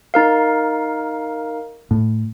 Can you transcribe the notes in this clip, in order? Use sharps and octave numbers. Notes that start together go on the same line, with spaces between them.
D#4 A#4 F5
A2